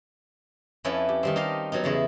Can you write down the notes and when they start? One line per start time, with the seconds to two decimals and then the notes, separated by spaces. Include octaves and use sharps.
0.84 F2 C#4 E4 B4 G5 A5
1.09 G4
1.23 D#3 G3 C4
1.36 D#4 G4 D#5 F5 A5
1.72 F#3 B3 D#4
1.84 E2 C#3 E4 D#5